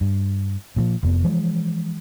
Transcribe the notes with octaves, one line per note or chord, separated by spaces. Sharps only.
G2
A#2 E3 F3
F1 F2 B3
E3 F3 G#3